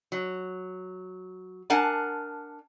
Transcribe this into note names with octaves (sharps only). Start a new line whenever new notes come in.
F#3
D4 A#4 F#5 G#5 A5